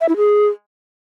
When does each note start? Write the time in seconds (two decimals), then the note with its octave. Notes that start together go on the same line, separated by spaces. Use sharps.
0.01 E5
0.09 E4
0.17 G#4